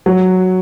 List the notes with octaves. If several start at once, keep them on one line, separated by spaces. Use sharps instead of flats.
F#3